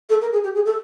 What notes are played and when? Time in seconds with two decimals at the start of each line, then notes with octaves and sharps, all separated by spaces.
0.09 A4
0.21 A#4
0.32 G#4
0.43 G4
0.55 G#4
0.65 A4